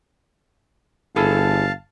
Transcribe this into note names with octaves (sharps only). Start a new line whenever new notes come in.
G1 E4 G#4 A4 F5 A5